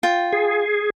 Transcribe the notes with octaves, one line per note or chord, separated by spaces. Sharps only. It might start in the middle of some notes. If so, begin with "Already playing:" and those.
F4 G5
G#4